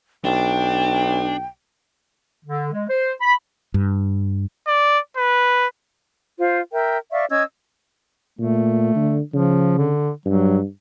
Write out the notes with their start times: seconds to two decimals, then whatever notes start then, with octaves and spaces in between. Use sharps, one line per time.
0.25 B1 D4 G5
2.45 D3
2.72 G#3
2.90 C5
3.21 B5
3.74 G2
4.67 D5
5.17 B4
6.39 F4 C5
6.72 A#4 E5 G5
7.11 D5 E5 F5 C#6
7.30 C#4 D#5 E6 G#6
8.39 A#2 A3
8.96 D3
9.34 C#3 F3
9.78 D3
10.26 G2 F#3